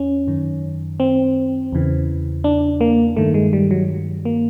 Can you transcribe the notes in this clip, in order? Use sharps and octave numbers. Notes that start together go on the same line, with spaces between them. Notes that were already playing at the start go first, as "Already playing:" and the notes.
Already playing: E2 C#4
F#2 D#3
C4
E2 C#3 E3
D4
A#3
G2 D#3 A3
G#3
G3
F#3
A#3